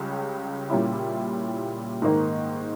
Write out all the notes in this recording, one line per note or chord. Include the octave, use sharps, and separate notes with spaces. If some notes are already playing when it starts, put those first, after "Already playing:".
Already playing: C#2 C#3 G3 C#4
A#2 G3 C#4 E4
G#2 D#3 A#3 D#4